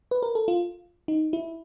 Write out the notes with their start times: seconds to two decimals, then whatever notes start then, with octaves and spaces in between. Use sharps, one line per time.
0.11 B4
0.23 A#4
0.35 A4
0.48 F4
1.08 D#4
1.33 E4